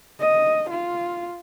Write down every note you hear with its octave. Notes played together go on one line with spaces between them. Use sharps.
D#5
F4